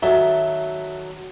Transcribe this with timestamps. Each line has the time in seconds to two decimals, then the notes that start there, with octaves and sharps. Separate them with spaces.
0.02 D#3 F#3 A4 E5